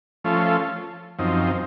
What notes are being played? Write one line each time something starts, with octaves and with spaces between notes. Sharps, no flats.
F3 A3 C#4 F4 A4
F#2 F3 C4 D#4